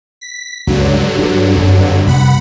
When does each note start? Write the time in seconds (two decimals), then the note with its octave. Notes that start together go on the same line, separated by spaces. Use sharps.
0.21 B6
0.67 C#2 G2 D3 F#3
1.19 D4
1.55 F#2 C4
2.07 C3 G3 B3 F#5 B5